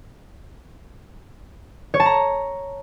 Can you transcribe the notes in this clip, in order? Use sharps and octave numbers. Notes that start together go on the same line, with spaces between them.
C#5
A5
A#5